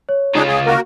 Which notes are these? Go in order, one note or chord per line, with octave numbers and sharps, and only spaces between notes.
C#5
C#3 D4 D#4 F4 G#4
G#4
A#3 F#4 A#4